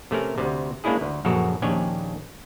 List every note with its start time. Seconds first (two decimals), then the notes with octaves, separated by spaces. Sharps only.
0.11 C3 A3 C#4 A#4
0.38 D2 C3
0.84 G#3 A#3 C#4 D4 E4 G#4
1.01 D2
1.25 A#1 F#2 C#3 F#4 A4 A#4
1.62 A#1 D#2 C#4 D4 G4 G#5